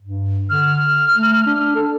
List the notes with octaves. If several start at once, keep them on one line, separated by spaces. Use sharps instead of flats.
G2
D3 F6
A3
D4
A4